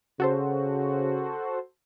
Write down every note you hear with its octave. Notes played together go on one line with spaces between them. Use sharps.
C#3 F#4 A4 C5